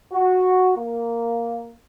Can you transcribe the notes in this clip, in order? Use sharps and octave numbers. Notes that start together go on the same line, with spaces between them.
F#4
A#3